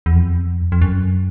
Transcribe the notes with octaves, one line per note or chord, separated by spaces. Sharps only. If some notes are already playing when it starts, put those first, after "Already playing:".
E2
F2
F2
F#2